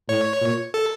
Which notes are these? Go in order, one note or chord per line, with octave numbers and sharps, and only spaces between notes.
A2 C#5
A#2
A4